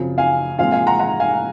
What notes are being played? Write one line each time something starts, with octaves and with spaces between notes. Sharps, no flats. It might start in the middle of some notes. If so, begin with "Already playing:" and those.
Already playing: F#2 C#3 F3 C4
F5 G#5
A#2 F3 G#3 C4 F5 G#5
F5 G#5
F#5 A#5
F#5 A#5
F5 G#5